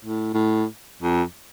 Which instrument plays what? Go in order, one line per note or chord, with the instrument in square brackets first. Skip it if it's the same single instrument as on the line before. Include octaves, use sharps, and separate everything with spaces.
[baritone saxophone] A2
A2
F2